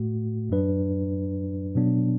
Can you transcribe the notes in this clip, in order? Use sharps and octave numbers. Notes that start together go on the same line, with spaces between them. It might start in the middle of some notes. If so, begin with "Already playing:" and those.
Already playing: A2 A3 F#4
F#2 F#3 D4 B4
B2 F#3 B3 D4